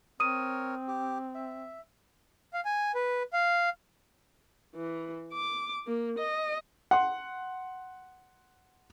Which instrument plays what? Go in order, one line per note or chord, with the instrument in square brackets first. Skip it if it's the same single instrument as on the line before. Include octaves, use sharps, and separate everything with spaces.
[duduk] C4 [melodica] A#4 C#5 [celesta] D#6 D#7
[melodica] G4
E5
[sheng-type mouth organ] F5
G#5
B4
F5
[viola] E3
D6
A#3
D#5
[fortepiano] F#5 C6